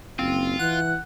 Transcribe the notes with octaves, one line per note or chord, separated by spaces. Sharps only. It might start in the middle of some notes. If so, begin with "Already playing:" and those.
F#1 C4 F4
E3 F#5 F#6